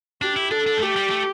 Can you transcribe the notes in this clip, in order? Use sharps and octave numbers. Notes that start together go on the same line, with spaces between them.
D4 G4
E4
D4 A4
D4
G3
A3 G4
G3
A3